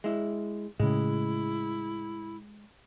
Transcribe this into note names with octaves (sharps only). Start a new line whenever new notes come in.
G#3 E4
A2 C#3 G#3 E4